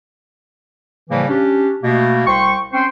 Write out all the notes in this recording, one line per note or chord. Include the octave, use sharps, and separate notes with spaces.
A2 C#3 E3 F3 G3 A#3
C#4 D4 G4
B2 A3 A#3
C2 C5 G5 C#6
C4 C#4 C5 G5 C6 C#6